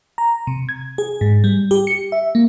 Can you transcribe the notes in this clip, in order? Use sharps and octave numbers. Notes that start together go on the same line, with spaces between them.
A#5
C3
G#6
G#4
G#2
G3
G4
C#7
E5
A#3